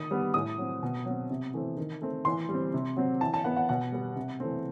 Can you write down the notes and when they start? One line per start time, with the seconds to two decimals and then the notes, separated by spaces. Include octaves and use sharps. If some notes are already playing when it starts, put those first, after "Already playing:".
Already playing: D#3 D#6
0.11 G3 B3
0.34 A2 D#6
0.58 F#3 C4
0.83 B2
1.05 F#3 C4
1.30 C3
1.54 E3 A3 C4
1.77 D#3
2.01 A3 C4
2.25 E3 C6
2.49 G3
2.54 C4
2.74 C3
2.97 F#3 C4
3.21 E3 A5
3.34 A5
3.44 B3 F#5
3.56 F#5
3.69 B2 F#5
3.92 G3 B3
4.16 C3
4.40 E3 A3 C4